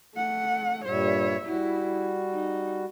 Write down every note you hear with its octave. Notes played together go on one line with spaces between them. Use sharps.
A3 F#5
G2 A#2 G3 C#5 E5
G3 E4 F#4
D#4